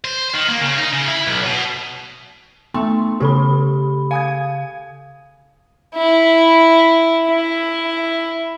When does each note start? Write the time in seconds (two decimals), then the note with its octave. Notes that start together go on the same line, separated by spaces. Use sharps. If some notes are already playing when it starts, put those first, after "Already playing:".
0.04 C5
0.34 D#3
0.48 A#3
0.61 C#3
0.78 D#4
0.94 C#3
1.09 E4
1.27 B1
1.45 B2
2.74 A3 B3 C6
3.20 C#3 G4 A4 B5
4.11 F5 G#5 D#6 G#6
5.95 E4
7.28 E4